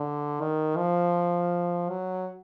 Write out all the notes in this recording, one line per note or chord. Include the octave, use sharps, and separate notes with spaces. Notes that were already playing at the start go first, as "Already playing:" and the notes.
Already playing: D3
D#3
F3
F#3